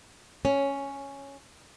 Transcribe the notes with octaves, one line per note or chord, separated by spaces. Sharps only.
C#4